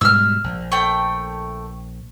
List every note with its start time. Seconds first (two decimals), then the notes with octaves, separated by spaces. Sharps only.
0.01 G#2 B2 G3 E6 F6
0.44 A#1
0.72 A3 G5